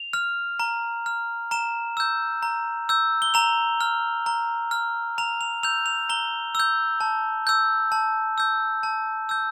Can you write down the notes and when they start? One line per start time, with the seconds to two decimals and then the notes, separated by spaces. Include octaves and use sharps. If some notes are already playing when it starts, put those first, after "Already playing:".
Already playing: F7
0.13 F6
0.60 A#5
1.06 F6
1.51 A#5 E7
1.97 E6 G6
2.43 A#5
2.89 E6 G6
3.22 G7
3.34 A#5 F7
3.81 F6
4.26 A#5
4.71 F6
5.18 A#5 F7
5.41 F7
5.63 E6 G6 F7
5.86 F7
6.09 A#5 G7
6.55 E6 G6
7.01 A5
7.47 E6 G6
7.92 A5
8.38 E6 G6
8.83 A5
9.29 E6 G6